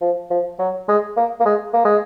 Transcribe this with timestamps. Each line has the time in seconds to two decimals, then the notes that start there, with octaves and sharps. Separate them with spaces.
0.01 F3
0.30 F3
0.59 F#3
0.88 G#3
1.17 A#3
1.40 A#3
1.45 G#3
1.74 A#3
1.85 G#3